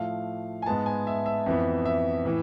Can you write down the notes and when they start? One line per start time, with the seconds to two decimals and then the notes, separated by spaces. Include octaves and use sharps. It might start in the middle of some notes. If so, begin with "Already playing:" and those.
Already playing: A2 F3 A3 F5
0.62 G#5
0.66 G#2 G#3 B3 A5
0.86 G#5
1.07 E5
1.26 E5
1.46 F2 E3 B3
1.85 E5
2.25 A2 E3